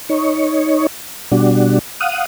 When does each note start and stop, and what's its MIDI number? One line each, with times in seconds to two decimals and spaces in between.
0.09 0.87 63
0.09 0.87 73
1.32 1.79 47
1.32 1.79 55
1.32 1.79 62
1.32 1.79 66
2.00 2.25 77
2.00 2.25 78
2.00 2.25 87